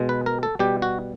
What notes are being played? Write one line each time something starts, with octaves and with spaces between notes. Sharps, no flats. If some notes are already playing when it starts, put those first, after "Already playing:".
Already playing: B2 G#3
B4
A#4
A4
B2 G3 G4
F#4